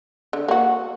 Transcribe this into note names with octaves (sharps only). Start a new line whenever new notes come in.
D3
A#3 F#4